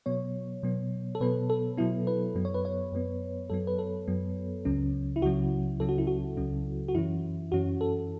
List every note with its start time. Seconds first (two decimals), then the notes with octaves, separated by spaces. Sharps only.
0.06 B2 F#3 B3 C#5
0.63 B2 F#3 B3
1.15 A4
1.20 B2 F#3 B3 B4
1.50 A4
1.77 B2 F#3 B3 E4
2.07 B4
2.35 F#2 F#3 B3
2.45 C#5
2.54 B4
2.65 C#5
2.92 F#2 F#3 B3
3.50 F#2 F#3 B3 A4
3.67 B4
3.79 A4
4.08 F#2 F#3 B3
4.65 C#2 C#3 F#3 C#4
5.16 E4
5.22 C#2 C#3 F#3 C#4 F#4
5.80 C#2 C#3 F#3 C#4 A4
5.89 F#4
5.98 E4
6.07 F#4
6.37 C#2 C#3 F#3 C#4
6.88 F#4
6.95 F#2 E3 C#4 E4
7.52 F#2 E3 C#4 F#4
7.81 A4